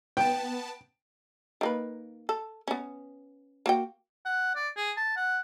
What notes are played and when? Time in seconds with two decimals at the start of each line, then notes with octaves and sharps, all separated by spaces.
0.17 B3 G5 A5
1.61 D#3 A#3 B4
2.29 A4
2.68 B3 C#4
3.66 A#3 F#4 G5
4.25 F#5
4.55 D5
4.77 G#4
4.97 A5
5.17 F#5